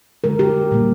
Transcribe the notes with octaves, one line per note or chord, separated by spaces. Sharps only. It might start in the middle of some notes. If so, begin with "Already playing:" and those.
D3 G#3 A#4
G4
A#2 G3 A#3